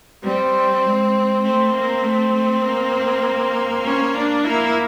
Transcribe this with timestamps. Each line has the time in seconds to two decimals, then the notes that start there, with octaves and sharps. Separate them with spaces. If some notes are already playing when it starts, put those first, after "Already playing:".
0.23 G3 C4
0.84 G#3
1.44 A3 C4
1.74 A#3
2.03 A3
2.33 A3
2.63 A#3
3.84 C#4
4.14 D4
4.44 A#3 E4